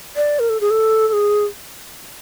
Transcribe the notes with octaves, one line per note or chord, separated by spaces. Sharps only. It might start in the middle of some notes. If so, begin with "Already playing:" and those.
D5
A#4
A4
G#4
A4
A4
G#4